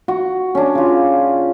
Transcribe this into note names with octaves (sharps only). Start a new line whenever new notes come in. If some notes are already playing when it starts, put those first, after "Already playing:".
F#4
C#4 D4
C#3 F4